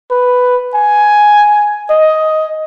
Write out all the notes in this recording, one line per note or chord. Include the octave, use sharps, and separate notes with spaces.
B4
G#5
D#5